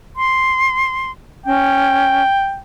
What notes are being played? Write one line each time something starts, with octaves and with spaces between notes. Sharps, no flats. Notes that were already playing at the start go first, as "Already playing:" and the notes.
C6
C#4 G5